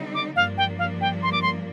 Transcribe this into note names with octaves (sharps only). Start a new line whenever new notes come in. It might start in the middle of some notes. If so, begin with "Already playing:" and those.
Already playing: D3 G3 C4 D#4
D6
G2 F3 A#3 D4 F5
G5
F5
G5
C6
D6
C6